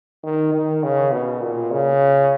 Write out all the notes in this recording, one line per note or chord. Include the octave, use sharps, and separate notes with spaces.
D#3
D#3
C#3
B2
A#2
C#3